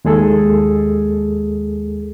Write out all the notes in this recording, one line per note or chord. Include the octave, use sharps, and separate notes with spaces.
D#2 G#3 G#4 A4